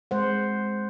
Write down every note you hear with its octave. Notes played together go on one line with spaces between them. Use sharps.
G#3 C5 F#5